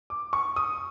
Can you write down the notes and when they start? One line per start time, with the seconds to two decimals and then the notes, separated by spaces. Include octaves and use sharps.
0.10 D6
0.33 C#6
0.56 D#6